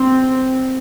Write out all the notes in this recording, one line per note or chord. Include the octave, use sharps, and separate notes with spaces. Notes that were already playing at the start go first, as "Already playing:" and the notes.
Already playing: C4